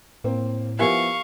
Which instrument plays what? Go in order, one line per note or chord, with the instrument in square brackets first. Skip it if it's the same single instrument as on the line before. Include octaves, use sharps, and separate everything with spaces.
[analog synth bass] A2 [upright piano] A#3 C4
[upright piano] F3 B3 E4 [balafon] G4 A#4 G#5 [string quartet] F5 C#6